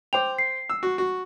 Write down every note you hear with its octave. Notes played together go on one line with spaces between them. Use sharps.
C5 G5 D6 F7
C7
E6
F#4
F#4